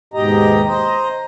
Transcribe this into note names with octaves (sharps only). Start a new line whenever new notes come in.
D#2 G#2 B2 G4 D#5 A#5
C5 D#5 A#5